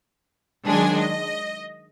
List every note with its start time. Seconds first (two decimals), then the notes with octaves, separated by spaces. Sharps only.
0.66 D#3 F#3 G#3 D4 G#5
0.97 D#5